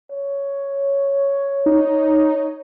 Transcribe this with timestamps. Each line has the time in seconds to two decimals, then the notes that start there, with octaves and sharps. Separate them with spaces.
0.11 C#5
1.66 D#4